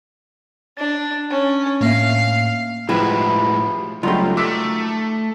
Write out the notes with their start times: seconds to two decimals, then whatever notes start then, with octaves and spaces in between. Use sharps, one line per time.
0.77 D4 A6
1.30 C#4
1.81 A2 A#3 E5 F5
2.89 A2 F3 G3 G#3 E4 F#4 B4
4.03 C#2 F#3 G3 A3 D#4 F4 C6
4.37 D#3 A3 D6 E6 B6